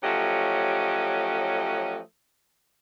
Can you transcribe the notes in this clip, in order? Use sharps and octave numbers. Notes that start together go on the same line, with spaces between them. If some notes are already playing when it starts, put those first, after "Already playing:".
F3 F#3 A3 C#4 G4 D#5